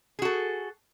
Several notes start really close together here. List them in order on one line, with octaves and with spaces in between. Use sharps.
G#4 F#4 A4